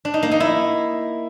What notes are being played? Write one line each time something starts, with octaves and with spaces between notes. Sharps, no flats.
D4
D#4
A#3
D#4
E4